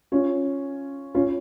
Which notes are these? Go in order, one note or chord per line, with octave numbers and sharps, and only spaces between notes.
C#4 F4
C#4 F4